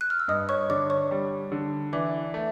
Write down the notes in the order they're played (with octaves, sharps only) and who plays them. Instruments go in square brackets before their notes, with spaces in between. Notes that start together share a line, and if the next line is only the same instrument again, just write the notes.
[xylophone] F#6
F6
E6
[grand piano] G2 [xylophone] D#5 D#6
[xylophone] C#5 C#6
[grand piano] D3 [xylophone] D5 D6
[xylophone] C#5 C#6
[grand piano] G3
D3
[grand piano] E3 [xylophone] D5 D6
[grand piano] A3